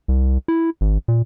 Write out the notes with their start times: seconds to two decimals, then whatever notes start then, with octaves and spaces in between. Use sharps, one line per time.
0.08 C2
0.48 E4
0.81 G#1
1.08 A#2